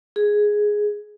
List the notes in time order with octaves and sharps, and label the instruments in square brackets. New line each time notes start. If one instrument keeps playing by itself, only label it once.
[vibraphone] G#4